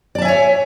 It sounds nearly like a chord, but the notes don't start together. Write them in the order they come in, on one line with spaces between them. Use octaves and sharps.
D5 A5 E5 G#5 C#5